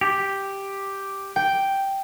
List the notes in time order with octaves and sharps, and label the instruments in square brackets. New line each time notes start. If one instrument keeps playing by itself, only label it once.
[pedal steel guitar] G4
[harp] G5